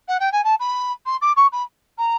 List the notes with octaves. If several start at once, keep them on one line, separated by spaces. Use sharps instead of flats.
F#5
G5
G#5
A5
B5
C6
D6
C#6
B5
A#5